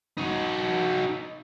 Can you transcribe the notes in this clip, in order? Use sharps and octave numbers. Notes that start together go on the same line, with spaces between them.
D#4 F#4